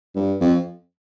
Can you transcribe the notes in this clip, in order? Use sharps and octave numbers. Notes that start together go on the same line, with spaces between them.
G2
F2